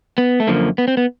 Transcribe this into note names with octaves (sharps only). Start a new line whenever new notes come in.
B3
A3
F#2 D3 F3 A#3
B3
C4
B3